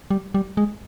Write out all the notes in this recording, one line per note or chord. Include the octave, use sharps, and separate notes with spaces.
G3
G3
G#3